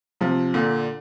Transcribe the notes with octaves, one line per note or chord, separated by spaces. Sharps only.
C3 F3
A#2 D3